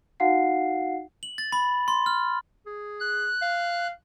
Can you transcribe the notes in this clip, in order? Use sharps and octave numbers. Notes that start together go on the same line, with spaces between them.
D#4 F#4 F5 F#5 C7
F#7
A6
B5
C6
F6
G#4
F#6
F5